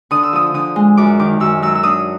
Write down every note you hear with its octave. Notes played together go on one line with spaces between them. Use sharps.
D3 D#6
E6
F3 D#6
D3 D#6
G#3
F#2 D6
D#3 D6
F#2 E6
F#3 E6
E6
D4 D#6